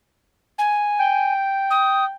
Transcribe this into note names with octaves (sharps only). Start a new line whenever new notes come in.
G#5
G5
D#6